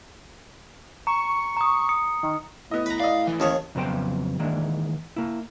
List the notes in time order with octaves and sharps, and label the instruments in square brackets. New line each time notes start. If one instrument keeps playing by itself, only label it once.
[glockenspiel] A#5 [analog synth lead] C#6
[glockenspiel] A#5 D#6
D#6 C#7
[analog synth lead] D#3
[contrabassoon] A2 [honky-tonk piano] B3 D#5
[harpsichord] B4 A#5
[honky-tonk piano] D5 D#5 [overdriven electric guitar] F5
[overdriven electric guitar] E3
[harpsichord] D#2 G#4 C#5 [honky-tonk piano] C#4 A5
[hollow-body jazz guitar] F2 C#3 F#3 B3 C5 G5
D#3 E3 G#3 A#3 D4
A#3 E4